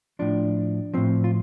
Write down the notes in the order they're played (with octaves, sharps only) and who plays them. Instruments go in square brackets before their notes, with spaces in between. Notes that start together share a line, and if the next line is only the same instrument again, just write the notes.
[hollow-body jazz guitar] A2 F3 D4
A2 F3 C4
F4